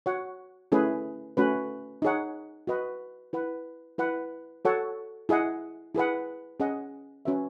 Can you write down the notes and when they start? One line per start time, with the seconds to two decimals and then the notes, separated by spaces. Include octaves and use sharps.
0.06 F#4 C#5 F#5
0.72 A3 C#4 E4 G#4 B4
1.37 A3 C#4 F#4 B4
2.02 D#4 G#4 C#5 F#5
2.67 F#4 B4 D#5 F#5
3.33 E4 B4 F#5
3.98 E4 B4 F#5
4.65 F#4 A4 C#5 F#5
5.29 E4 G#4 D#5 F#5
5.95 E4 G#4 B4 F#5
6.60 C#4 G#4 D#5 F#5
7.25 C#4 F#4 B4 E5